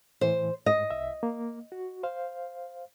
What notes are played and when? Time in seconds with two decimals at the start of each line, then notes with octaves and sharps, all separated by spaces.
0.21 A2 E3 C5
0.66 G#2 D#5
0.91 C2 E5
1.23 A#3
1.72 F#4
2.03 C5 F5